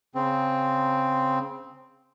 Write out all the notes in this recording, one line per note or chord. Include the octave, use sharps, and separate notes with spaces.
C#3 C4